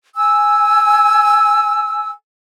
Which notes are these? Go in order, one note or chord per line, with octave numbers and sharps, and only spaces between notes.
G#5 E6